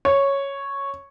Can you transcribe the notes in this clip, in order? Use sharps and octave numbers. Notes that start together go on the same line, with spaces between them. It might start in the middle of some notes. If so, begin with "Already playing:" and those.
C#5